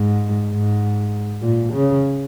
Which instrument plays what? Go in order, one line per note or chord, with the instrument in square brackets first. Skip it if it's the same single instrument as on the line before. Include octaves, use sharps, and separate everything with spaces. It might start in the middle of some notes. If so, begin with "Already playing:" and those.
Already playing: [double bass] G#2
G#2
A#2
C#3